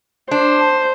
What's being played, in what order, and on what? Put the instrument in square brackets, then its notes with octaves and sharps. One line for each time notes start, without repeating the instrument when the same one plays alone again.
[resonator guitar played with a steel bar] D4 [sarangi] C5